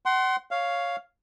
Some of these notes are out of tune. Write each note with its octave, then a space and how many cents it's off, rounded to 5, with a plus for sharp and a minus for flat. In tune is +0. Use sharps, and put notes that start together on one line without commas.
F#5 +35 C6 +0
C#5 +5 F5 +0